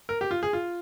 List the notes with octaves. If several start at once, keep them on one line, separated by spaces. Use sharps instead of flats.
A#4
G4
F4
G#4
F4